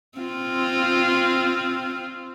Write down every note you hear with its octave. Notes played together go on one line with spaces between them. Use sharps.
C4 F4